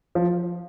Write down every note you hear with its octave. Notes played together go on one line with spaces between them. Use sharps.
F3